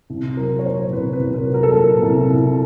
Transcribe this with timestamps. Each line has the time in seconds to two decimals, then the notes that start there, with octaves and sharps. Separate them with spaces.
0.10 C2
0.37 F#3 A#4
0.59 C#5
0.65 A#2 C5
0.92 C2 B4
1.13 B4
1.19 C2
1.34 A#4
1.48 F#3
1.54 A#4
1.63 A4
1.72 A#2 A#4
2.02 C2
2.30 C2